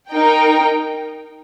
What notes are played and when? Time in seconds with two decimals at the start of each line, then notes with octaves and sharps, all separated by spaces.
0.12 D#4 A#4 G5